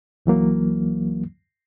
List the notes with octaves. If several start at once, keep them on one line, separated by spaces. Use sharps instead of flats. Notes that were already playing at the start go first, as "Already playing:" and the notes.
C#2 E3 F#3 A#3